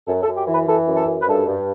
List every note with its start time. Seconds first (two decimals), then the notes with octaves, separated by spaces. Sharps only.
0.07 F#2 A4
0.23 A4
0.27 F#2
0.37 G4
0.47 E3
0.52 B4
0.67 E3 A4
0.87 F#2
0.96 A4
1.06 F#2
1.21 B4
1.26 G2 A4
1.47 G2